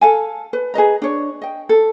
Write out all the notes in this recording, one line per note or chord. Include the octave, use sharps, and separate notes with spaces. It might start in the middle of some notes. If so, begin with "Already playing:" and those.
A4 F5 G#5
B4
G#4 B4 D#5 A#5
D4 C#5
D#5 G5
A4